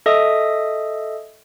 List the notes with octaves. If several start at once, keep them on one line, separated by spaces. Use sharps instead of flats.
A4 D#5 E5 D#6